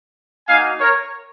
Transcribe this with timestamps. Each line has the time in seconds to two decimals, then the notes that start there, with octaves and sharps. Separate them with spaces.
0.48 A#3 D#4 F#4 F5 G#5
0.80 A#4 C#5